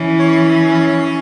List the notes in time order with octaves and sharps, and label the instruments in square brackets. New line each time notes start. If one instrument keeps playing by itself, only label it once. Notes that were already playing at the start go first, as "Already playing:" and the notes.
Already playing: [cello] E3 [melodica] C#4
[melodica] C#5
C#4